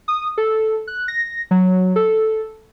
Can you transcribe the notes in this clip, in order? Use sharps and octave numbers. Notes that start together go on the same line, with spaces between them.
D#6
A4
F#6
A#6
F#3
A4